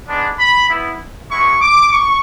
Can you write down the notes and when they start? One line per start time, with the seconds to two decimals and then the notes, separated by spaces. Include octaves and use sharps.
0.09 G#3 B3 D4
0.39 B5
0.70 B3 E4
1.31 G#3 B3 E4 C#6
1.62 D6
1.92 C#6